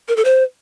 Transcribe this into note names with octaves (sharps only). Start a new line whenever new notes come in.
A#4
A4
C5